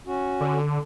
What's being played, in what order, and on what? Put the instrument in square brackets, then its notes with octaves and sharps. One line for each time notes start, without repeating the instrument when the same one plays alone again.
[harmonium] C#4 F#4
[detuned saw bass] D3